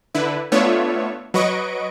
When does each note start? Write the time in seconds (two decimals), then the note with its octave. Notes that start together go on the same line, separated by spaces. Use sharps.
0.15 D3 E4 B4
0.52 A3 B3 D4 F4 C#5 E5
1.34 F#3 B4 D#5 C#6 D7